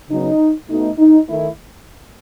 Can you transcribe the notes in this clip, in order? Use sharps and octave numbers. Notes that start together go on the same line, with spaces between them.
C#3 F#3 B3 D#4
B2 A3 D#4
D#4
D#3 A3 E4